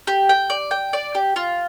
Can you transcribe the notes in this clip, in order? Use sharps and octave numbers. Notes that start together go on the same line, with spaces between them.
G4
G5
D5
G5
D5
G4
F4